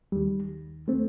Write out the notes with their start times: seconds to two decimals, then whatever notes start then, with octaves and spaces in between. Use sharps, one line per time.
0.12 D#2 D#3 G3
0.88 D#3 A3 C4